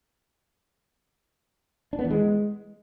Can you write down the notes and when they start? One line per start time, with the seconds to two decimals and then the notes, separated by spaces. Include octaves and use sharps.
1.93 D4
1.99 B3
2.05 E3
2.10 G#3